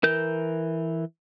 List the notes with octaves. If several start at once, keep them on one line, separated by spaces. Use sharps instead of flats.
E3 A#4 G6